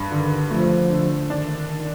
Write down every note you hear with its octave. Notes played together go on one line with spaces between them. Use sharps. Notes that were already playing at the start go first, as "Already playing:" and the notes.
Already playing: G2
D3 D#3
F3 A3
D3
D#3 D4